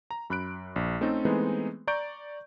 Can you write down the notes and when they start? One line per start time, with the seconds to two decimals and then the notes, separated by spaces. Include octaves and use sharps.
0.11 A#5
0.30 F#2 B5 F#6 D7
0.76 A#1
1.01 A3 C4 C#4 D#4 A4
1.25 E3 G#3 A3 B3 C4 D#4
1.87 D5 A#5 C#6 G6 D7